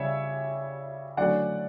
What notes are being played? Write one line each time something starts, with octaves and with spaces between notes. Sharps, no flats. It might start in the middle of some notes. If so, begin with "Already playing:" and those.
Already playing: C#3 G3 C#4 C#5 E5
D3 F#3 A3 C#4 D5 F#5